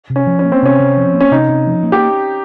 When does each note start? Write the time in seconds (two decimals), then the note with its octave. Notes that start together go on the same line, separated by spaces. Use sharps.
0.10 C3
0.16 C#4
0.27 F3
0.39 C#4
0.45 A#3
0.52 C4
0.62 C3 C#4
0.80 C3
0.97 F3
1.14 A#3
1.21 C#4
1.31 C3 D#4
1.49 C3
1.67 F3
1.83 A#3
1.92 G4